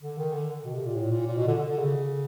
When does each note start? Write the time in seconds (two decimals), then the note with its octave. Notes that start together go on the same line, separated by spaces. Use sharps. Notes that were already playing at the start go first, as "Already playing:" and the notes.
0.02 D3
0.18 D#3
0.33 D3
0.65 B2
0.75 C3
0.86 A#2
0.95 A2
1.11 A#2
1.27 A#2
1.37 B2
1.47 D3
1.58 D3
1.69 D3
1.79 C#3